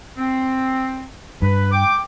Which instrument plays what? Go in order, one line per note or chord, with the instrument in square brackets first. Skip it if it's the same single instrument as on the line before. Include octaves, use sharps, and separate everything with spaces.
[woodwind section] C4
[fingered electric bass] G2 [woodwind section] B4
[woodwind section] G5 D6